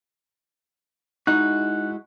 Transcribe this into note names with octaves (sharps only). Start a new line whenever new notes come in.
G#3 D#4 E4 F#4 F#6